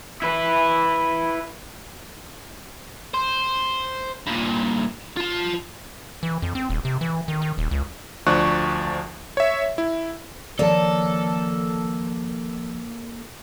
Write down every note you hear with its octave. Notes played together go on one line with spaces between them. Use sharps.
E4 B4
C5
G2 A#2
F4 A5
E3
F2
C4
D#1
C3
E3
D#3
D#3
D#1
C#2
D2 F3 D4 C#6 F#6
C#5 E5
E4
D#3 F3 A#3 A4 C#5 D5 A5